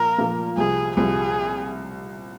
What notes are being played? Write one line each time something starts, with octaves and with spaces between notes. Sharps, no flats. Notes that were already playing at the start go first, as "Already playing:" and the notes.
Already playing: A#2 F3 A#3 A#4
A#2 F3 A#3
C2 C3 F3 G#4
C2 C3 F3 G#4